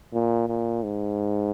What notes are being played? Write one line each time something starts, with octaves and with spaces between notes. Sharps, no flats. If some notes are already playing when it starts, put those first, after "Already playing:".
A#2
A#2
G#2